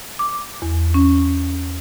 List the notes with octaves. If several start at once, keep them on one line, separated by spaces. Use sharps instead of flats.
D6
E2
C#4